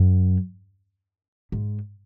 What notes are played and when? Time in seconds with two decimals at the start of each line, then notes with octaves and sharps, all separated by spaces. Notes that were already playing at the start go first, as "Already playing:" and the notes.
Already playing: F#2
1.52 G#2